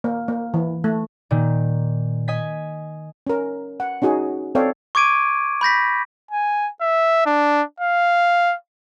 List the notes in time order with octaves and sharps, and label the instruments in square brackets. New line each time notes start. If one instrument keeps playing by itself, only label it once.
[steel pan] A#3
A#3
E3
A3
[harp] A#2 D#3
D#5 G#5 B6
[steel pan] C#4 A#4
F#5
C#4 D#4 F#4 G#4
C4 A4 C#5 D5 F5 G5
[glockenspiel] C#6 D6 G#6 D7 D#7
B5 G6 A#6 B6
[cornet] G#5
E5
D4
F5